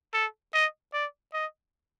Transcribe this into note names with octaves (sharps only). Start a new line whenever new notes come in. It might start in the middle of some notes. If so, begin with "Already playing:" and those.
A4
D#5
D5
D#5